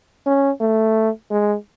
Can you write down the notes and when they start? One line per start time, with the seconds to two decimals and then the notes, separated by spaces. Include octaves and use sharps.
0.26 C#4
0.61 A3
1.31 G#3